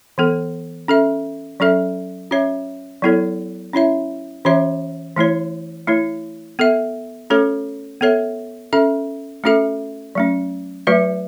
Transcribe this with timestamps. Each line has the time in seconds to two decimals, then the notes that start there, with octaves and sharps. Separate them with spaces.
0.18 E3 B3 A4
0.88 C#4 A4 E5
1.60 F#3 C#4 A4 E5
2.31 C#4 F#4 C#5 E5
3.02 F#3 B3 E4 A4 C#5
3.73 C#4 E4 C#5 E5
4.45 E3 C#4 F#4 C#5 E5
5.17 E3 A3 E4 C#5
5.87 A3 E4 C#5
6.59 B3 A4 E5
7.30 A3 C#4 F#4 A4 C#5
8.01 B3 A4 C#5 E5
8.73 C#4 A4 E5
9.44 A3 C#4 F#4 A4 E5
10.15 F#3 A3 C#4
10.87 F#3 A3 F#4 B4 E5